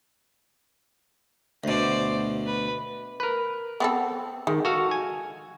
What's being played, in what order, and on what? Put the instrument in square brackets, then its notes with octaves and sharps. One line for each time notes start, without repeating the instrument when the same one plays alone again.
[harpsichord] D2 B2 [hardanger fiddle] C5 D5
[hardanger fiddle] B4
[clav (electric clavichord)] A#4 B4
[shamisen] B3 C4 A4
[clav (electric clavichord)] D#3 [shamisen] G#3
[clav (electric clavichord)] F#4 A4 F5
G#5